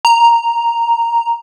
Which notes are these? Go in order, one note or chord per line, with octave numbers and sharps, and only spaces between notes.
A#5